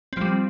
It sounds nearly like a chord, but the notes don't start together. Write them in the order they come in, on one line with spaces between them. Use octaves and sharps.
C4 F3 G3